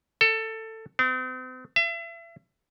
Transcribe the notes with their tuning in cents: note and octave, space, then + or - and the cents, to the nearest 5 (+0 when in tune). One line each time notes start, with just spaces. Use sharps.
A4 +15
C4 -40
E5 +35